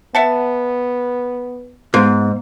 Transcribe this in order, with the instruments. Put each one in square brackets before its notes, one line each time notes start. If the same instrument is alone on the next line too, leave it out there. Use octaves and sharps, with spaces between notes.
[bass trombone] B3 [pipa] E5 F#5 A5
[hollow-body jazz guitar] G#2 [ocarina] B3 [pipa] F5